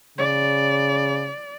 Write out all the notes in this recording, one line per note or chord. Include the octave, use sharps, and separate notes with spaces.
C#3 D5